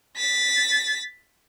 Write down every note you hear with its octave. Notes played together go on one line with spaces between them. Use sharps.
A6 B6